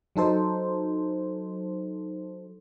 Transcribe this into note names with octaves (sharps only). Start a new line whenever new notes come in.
F#3 D#4 A4 C5